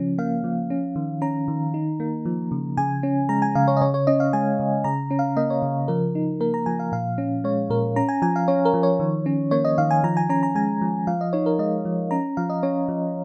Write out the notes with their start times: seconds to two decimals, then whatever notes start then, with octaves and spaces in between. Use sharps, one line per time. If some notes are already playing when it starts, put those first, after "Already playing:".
Already playing: C#3 F3 C#4
0.18 A#3 F5
0.44 F3
0.70 C#4
0.96 D#3
1.22 C#4 A#5
1.48 D#3
1.74 D#4
2.00 A#3
2.25 F3
2.51 C#3
2.77 C#3 G#5
3.03 C#4
3.29 G#3 A#5
3.42 G#5
3.55 C#3 F5
3.68 C#5
3.77 D#5
3.81 C#3 C#5
3.94 C#5
4.07 C#4 D#5
4.20 F5
4.33 G#3 G#5
4.60 C#3
4.84 C#3 A#5
5.11 C#4
5.19 F5
5.37 A#3 D#5
5.50 C#5
5.62 C#3
5.88 F3 A#4
6.15 D#4
6.40 A#3 A#4
6.54 A#5
6.66 F3 G#5
6.79 F5
6.92 A#2 F5
7.18 C#4
7.44 G#3 C#5
7.70 A#2 A#4
7.96 C#4 A#5
8.09 G#5
8.22 F3 G#5
8.36 F5
8.48 C#4 C#5
8.65 A#4
8.74 F3
8.83 C#5
9.00 D#3
9.26 C#4
9.51 A#3 C#5
9.65 D#5
9.78 D#3 F5
9.91 G#5
10.04 F3 A#5
10.17 G#5
10.29 C#4 A#5
10.43 A#5
10.55 G#3 G#5
10.81 F3
11.07 F3 F5
11.21 D#5
11.33 D#4 C#5
11.46 A#4
11.59 G#3 D#5
11.85 F3
12.11 C#4 A#5
12.37 F3 F5
12.50 D#5
12.63 C#4 C#5
12.89 F3